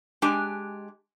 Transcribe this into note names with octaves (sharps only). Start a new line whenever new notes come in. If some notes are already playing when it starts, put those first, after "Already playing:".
G#3 D4 G4 G#5